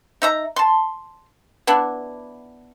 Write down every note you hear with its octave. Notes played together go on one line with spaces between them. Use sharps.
D#4 E5 A#5
A5 C6
B3 D4 E4